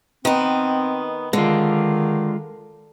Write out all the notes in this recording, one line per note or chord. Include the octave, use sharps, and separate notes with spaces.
D#3 B3 C4
D3 D#3 G#3 F4